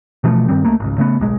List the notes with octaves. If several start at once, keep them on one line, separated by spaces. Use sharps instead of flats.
B2 E3 F3 A3
G2 D#3 G3 C4
C#2 A3 A#3
G#1 C#2
C#3 A3 B3
D1 B1 G#3